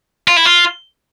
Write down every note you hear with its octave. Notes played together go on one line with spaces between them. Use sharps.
F4
E4
F4